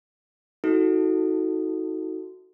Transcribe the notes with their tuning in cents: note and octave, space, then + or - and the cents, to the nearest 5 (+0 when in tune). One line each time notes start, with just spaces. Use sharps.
D#4 +40 F#4 +0 A4 +10